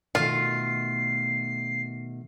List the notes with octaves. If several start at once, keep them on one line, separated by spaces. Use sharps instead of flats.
B2 D#3 A3 F4 C7